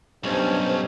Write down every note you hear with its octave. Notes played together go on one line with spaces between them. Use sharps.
B1 G2 C#4 C5